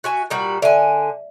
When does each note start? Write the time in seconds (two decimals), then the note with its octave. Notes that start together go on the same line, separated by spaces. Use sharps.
0.04 F#4 E5 G#5
0.30 A#2 G3 F#4
0.62 D3 D5 E5 G#5